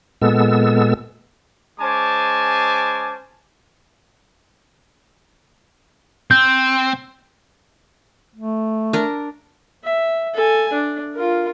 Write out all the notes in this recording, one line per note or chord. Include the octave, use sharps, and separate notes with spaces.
A#2 G#3 B3 A4 E6
G#3 C#4 C5 G#5 A5 D6
C4 G6
A3
D4 A#4
E5
A4 G#5
D4
F4 A#4